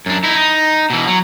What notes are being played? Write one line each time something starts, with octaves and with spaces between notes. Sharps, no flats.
F#2 D4
D#4 E4
D#4
B2 E3
F#3